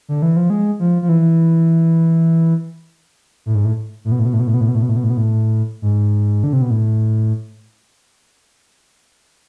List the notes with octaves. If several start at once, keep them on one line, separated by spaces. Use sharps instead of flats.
D3
E3
F3
G#3
F3
F3
E3
A2
G#2
A2
A2
B2
A2
B2
A2
B2
A2
B2
A2
B2
A2
B2
A2
B2
A2
B2
A2
G#2
D3
C3
B2
A2